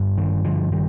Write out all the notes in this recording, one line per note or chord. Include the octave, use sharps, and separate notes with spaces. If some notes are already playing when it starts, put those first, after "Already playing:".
Already playing: G1 G2
D#3
D3 F3
D#3 G3